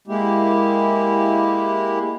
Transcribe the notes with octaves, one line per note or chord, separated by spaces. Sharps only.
G#3 A#3 E4 G4